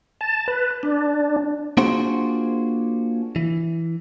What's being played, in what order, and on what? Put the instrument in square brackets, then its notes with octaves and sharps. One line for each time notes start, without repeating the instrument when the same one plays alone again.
[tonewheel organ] A5
B4
D4
[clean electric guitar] A#3 D4 F4 F#4 G#4 C5
E3